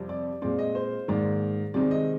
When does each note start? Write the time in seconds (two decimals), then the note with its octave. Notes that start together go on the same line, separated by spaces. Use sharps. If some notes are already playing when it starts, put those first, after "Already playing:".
Already playing: F2 C3 G3 C4
0.09 D5
0.42 A#2 G#3 C4 D5
0.59 D#5
0.75 C5
1.08 G#2 D#3 A#3 D5
1.74 C3 D#3 G#3 C4 D5
1.91 D#5